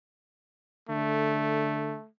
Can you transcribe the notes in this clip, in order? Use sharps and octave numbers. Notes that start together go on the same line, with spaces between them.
D3 A3